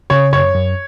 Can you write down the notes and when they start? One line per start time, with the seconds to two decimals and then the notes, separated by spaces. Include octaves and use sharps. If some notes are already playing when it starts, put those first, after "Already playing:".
0.10 C#3 C#5
0.33 F#2 C#5
0.55 F#2